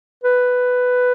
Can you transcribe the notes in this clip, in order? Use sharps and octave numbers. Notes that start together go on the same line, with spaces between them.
B4